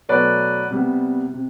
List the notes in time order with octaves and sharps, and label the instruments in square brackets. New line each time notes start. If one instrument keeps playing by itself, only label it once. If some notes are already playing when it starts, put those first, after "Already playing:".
[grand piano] B2 F#3 A3 B4 D5
C3 G3 B3
C3